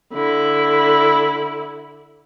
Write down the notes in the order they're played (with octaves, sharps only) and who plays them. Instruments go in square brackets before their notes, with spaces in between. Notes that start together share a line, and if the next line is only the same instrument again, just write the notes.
[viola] D3 E4